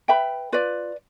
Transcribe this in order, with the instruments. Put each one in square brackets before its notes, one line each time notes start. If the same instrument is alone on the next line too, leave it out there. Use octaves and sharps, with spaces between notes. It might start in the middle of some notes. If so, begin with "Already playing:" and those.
[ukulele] B4 E5 G5 B5
F4 B4 D5